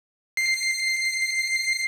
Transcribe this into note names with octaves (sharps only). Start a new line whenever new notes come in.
C7